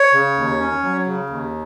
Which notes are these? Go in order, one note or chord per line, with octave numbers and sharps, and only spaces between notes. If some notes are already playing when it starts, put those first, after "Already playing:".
Already playing: C#5
C#3
D#2
C#4
F#3
C#3
D#2